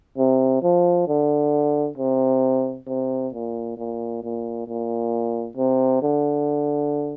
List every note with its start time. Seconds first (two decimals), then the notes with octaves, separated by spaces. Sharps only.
0.18 C3
0.62 F3
1.07 D3
1.98 C3
2.87 C3
3.33 A#2
3.77 A#2
4.23 A#2
4.67 A#2
5.57 C3
6.02 D3